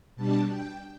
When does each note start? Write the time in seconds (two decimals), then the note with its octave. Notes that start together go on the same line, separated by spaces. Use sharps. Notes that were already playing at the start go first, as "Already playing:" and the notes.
0.16 B2 G3 D4 A5
0.48 G5